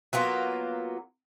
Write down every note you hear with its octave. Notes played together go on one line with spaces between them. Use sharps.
F#3 A#3 B3 F4